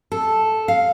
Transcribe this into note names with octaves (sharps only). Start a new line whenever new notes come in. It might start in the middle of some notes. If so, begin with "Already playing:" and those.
A4
F5